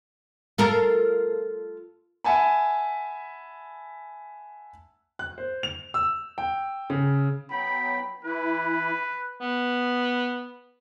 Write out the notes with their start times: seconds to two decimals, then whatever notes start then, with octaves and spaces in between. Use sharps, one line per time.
0.58 F4 A4 A#4
2.24 E5 F#5 G#5 A5 B5
5.19 F#6
5.38 C5
5.63 F7
5.94 E6
6.38 G5
6.90 C#3
7.50 F#3 B3 G5 B5
8.25 E3 E4 B4
9.41 B3